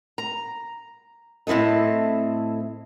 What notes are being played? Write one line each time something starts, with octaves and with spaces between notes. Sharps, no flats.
A#5
A2 C4 E4 A4 D#5